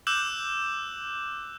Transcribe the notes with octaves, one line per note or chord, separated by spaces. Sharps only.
D6 E6 F#6 G6 E7 F#7